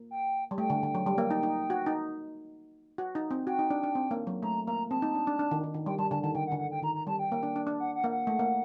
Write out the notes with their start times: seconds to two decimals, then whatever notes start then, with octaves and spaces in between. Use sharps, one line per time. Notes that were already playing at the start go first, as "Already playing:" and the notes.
Already playing: A#3
0.11 G5
0.51 G3
0.58 A3 G5
0.70 D3
0.83 D3
0.95 F#3
1.06 G3
1.18 A#3
1.31 D#4
1.43 D#4
1.70 F#4
1.86 D#4
2.98 F#4
3.15 D#4
3.31 C4
3.47 F#4 G5
3.59 D#4
3.70 D4
3.83 D4
3.95 C4
4.11 A#3
4.27 F#3
4.43 A3 A#5
4.66 A#3 A#5
4.90 C4 A5
5.02 D#4
5.15 D4
5.27 D4
5.39 D4
5.51 D#3
5.64 D#3
5.74 D#3
5.86 G3 G5
5.99 G3 A5
6.11 D3 A5
6.22 D#3 A5
6.35 D3 G5
6.47 F#5
6.52 D3
6.58 F#5
6.71 G5
6.82 D#3 A#5
6.95 A#5
7.07 G3 A5
7.19 G5
7.32 A#3
7.43 D4
7.56 D4
7.67 D4
7.80 F#5
7.95 F#5
8.04 A#3
8.11 F#5
8.27 A3
8.39 A#3